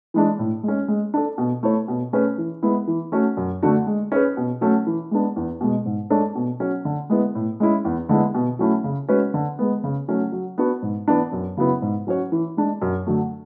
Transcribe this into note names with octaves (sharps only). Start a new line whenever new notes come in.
E3 G#3 D4
A2
G#3
C#4
G#3
D4 A4
B2
A3 E4 A4 C#5
B2
A3 C#4 G#4 B4
E3
G#3 B3 E4
E3
A3 C#4 F#4
F#2
D3 A3 D4 F#4
G#3
C#4 G#4 B4
B2
F#3 A3 C#4
E3
G#3 B3 D4
E2
B2 G#3
G#2
G#3 D4 A4 C#5
B2
F#3 C#4
D3
G#3 B3 E4
A2
G#3 C#4 E4
E2
D3 G#3 B3 E4
B2
F#3 A3 C#4 E4
C#3
G#3 C#4 F#4 B4
D3
G#3 B3
C#3
F#3 A3 C#4 F#4
F#3
B3 D4 F#4
G#2
E3 B3 D4
F#2
C#3 F#3 B3 E4
G#2
F#3 C#4 F#4 C#5
E3
G#3 D4
F#2
D3 F#3 A3